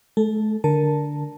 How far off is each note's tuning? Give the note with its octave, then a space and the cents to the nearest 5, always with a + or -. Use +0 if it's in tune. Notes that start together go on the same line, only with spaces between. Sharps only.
A3 -45 A4 +0
D3 +0 A#4 +0 A5 +0